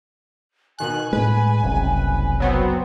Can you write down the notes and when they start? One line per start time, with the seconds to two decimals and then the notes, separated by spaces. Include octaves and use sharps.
0.79 B2 D#3 G#5 F#6
1.13 A2 G#3 B4
1.63 F#1 C2 C#4
2.40 F#3 B3 C4